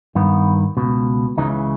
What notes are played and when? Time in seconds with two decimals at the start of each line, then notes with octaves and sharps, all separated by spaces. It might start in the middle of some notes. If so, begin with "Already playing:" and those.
0.15 G2 D#3 B3
0.77 C#2 B2
1.37 C#2 C#3 E3 D#4